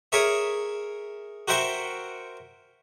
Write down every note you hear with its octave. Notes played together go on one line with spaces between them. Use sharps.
G#4 A#4 C#5 E5
F#4 A#4 C5 E5 G5 C#6